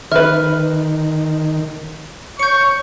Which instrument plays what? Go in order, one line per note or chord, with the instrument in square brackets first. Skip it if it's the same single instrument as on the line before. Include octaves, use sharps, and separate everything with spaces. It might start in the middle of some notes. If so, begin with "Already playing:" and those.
[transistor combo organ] D#3 [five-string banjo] B4 E5 [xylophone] F6
[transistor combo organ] C#5 [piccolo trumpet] C#6 [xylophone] G6 C#7